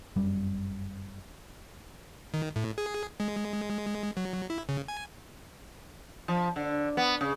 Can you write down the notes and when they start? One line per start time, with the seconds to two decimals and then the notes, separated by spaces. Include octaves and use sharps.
0.16 G1 F#2 G3
2.34 D#3
2.56 A2
2.78 G#4
3.20 G#3
4.17 F#3
4.50 E4
4.69 C#3
4.88 G#5
6.28 F3
6.56 D3
6.97 B3
7.21 C#3